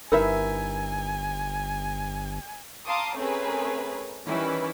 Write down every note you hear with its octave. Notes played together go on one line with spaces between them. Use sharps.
G1 D#4 E4 A#4 B4 E5 G#5
F5 A5 A#5 C6 D6 D#6
A3 C4 C#4 G#4 A#4 B4
D#3 E3 G3 C#4 E4 B4